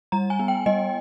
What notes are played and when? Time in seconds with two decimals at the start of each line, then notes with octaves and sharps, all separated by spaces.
0.12 G3 A#5
0.30 G#5
0.39 B3
0.48 G5
0.66 G3 D#5